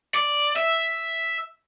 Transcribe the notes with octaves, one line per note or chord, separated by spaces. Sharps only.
D5
E5